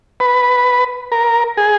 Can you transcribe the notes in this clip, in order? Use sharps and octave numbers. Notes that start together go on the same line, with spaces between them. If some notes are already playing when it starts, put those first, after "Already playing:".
B4
A#4
G#4